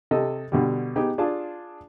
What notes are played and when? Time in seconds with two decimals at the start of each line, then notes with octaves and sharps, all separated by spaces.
0.11 C3 A4 D#5
0.52 B2 D3 G3
0.96 B3 D#4 G4 G#4
1.18 D4 F4 G#4 A5